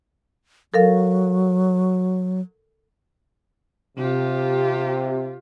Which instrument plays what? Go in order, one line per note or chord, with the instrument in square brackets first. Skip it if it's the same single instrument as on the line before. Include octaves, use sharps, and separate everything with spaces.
[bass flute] F#3 [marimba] A4 A#4 F5
[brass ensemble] C3 [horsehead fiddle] F4 G4